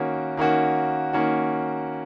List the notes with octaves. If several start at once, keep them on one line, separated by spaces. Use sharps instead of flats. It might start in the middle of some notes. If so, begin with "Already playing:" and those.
Already playing: D#3 A#3 C#4 F#4
D#3 A#3 C#4 F#4
D#3 A#3 C#4 F#4